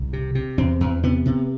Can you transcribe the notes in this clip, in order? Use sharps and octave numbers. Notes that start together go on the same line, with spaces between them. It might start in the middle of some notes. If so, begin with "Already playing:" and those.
Already playing: C2
C3
C3
E2 C4
E2
C3 B3
C3